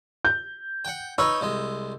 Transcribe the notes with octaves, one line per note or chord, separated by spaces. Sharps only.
G6
F#5 G5
D#4 B4 C#5 E6
C2 G#3